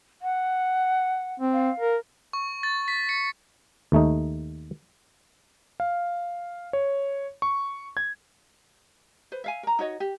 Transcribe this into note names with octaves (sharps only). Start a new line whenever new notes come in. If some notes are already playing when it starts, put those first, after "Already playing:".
F#5
C4
F5
A#4
C#6
A6
B6
C#7
D#2 A3 D#4
F5
C#5
C#6
G#6
B4 C5
E5 F5 G#5
A#4 A#5
D#4 F#4 C#5 D#5
G4